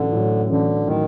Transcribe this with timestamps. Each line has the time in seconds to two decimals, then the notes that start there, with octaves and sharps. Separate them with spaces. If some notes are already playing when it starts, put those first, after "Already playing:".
Already playing: A1 A2 D3 F#3
0.12 A2 F#3
0.49 A1 D3
0.86 A2 D#3 F#3